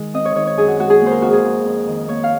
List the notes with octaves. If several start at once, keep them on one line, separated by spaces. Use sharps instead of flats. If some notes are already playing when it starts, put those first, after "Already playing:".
Already playing: D#3 G#3
C4 D#5
C#5
D#3 C#5
C#5
F#2 G#4
F#4
G#3 F#4
G#4
A#3
C5
A#4
F2 F#4
G#4
F2
F2
D#3
A#3 C#5
F5